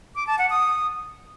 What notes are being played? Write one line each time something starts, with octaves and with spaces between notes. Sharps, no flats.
D6
A5
F#5
D#6